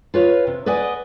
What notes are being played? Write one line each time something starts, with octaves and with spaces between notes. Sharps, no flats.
F4 B4 C#5 F5
C3
B4 D5 D#5 F#5 G#5